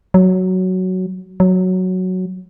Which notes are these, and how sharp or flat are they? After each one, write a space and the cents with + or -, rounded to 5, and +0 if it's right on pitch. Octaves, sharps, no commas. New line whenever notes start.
F#3 +5
F#3 +0